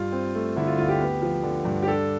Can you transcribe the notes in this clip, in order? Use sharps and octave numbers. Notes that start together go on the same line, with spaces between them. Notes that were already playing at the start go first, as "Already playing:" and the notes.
Already playing: G2 F4
C4
A3
D3 E4
F4
D2 F4
G4
B3
F3
D3
G2
G4
D4 A4